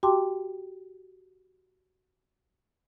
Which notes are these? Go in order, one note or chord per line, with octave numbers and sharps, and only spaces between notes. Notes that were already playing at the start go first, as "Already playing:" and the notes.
F#4 G4 G5 A5 C6 D6